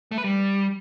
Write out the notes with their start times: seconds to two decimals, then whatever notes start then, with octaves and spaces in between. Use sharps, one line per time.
0.11 A3
0.18 B4
0.24 G3